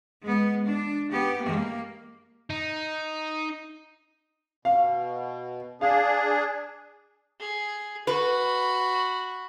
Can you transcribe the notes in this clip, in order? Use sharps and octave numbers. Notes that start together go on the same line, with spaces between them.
G#3 B3
D4
B3 G4
A#3
D#4
B2 F5
D4 G#4 F5
G#4
F#4 B4 B5